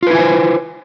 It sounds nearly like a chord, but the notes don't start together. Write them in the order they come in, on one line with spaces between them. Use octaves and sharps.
F4 B4 E4 G#5 C5